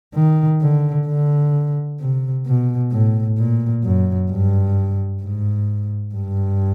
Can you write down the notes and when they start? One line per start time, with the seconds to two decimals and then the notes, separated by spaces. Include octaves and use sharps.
0.14 D#3
0.61 D3
1.07 D3
1.99 C3
2.46 B2
2.91 A2
3.38 A#2
3.84 F#2
4.31 G2
5.22 G#2
6.14 G2